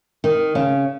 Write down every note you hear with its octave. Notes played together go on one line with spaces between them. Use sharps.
D#3
C#3